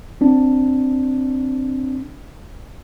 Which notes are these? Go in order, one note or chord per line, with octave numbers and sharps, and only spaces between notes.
C4 D4